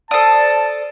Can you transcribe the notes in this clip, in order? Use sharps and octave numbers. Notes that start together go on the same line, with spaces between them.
A4 C5 D5 A5 D#6